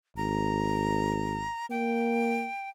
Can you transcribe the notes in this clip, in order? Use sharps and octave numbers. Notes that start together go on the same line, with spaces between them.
G#1 A#5
A#3 G5